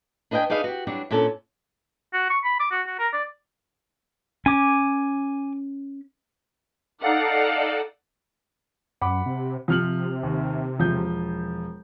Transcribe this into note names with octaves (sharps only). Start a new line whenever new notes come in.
D4 B4 D#5 E5 G5 G#5
D4 D#4 G#4 B4 F5
F#4 G4
F#3 G3 D4 F#4
A#2 C#4 D4 A4
F#4
C#6
B5
D6
F#4
F#4
A#4
D5
C#4 G#5 D6
D#4 A4 D5 F5 F#5
F#2 F#5 B5 D6
C3
C3 F3 F6 F#7
D#2
E1 F3 G6